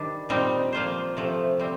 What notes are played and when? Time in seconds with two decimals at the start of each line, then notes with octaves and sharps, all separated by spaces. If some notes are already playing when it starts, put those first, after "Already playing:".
Already playing: D#3 G3 D4
0.29 A#2 G3 C4 D#4
0.73 F3 A#3 F4 C5
1.17 C3 F3 A3
1.59 G3 C4